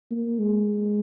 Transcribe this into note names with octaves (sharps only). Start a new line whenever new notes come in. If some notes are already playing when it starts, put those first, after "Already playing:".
A#3
G#3